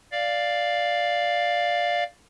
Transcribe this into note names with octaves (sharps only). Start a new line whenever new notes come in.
D5 F5